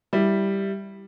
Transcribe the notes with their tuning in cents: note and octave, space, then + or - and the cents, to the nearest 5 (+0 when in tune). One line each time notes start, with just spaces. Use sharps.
G3 +0 E4 +0